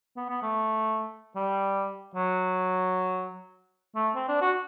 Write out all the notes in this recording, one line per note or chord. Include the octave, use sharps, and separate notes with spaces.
B3
B3
A3
G3
F#3
A3
C4
D4
F#4